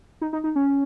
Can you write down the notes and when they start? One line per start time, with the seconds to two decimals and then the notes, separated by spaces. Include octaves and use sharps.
0.21 D#4
0.33 D#4
0.44 D#4
0.56 C#4